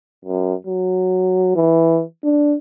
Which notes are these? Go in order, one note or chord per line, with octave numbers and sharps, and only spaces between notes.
F#2
F#3
E3
D4